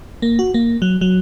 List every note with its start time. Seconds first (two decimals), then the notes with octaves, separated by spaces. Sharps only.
0.22 A#3
0.39 F#4
0.54 A#3
0.82 F#3
1.01 F#3